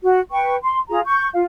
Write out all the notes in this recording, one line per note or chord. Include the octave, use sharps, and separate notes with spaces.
F#4
B4 G5 C#6
C6
F4 G#4 A#5
C#6 G6
F4 F5